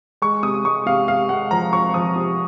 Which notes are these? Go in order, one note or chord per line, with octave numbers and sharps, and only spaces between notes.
G#3 C#6
C3 D#6
G#3 C#6
C3 F5
C3 F5
G#3 F#5
F3 A#5
F3 C#6
F3 D#6
C3